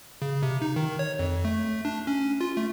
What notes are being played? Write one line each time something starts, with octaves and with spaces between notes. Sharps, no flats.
C#3
C3
D#4
D#3
C#5
F2
A3
D4
C#4
F4
A3